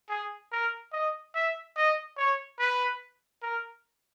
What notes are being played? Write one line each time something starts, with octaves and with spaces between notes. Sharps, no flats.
G#4
A#4
D#5
E5
D#5
C#5
B4
A#4